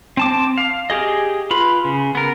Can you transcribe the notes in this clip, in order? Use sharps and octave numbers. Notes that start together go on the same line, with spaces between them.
C4 A5 D6
F5
G4 G#4 D#5
F4 B4 B5
C#3
B3 A#4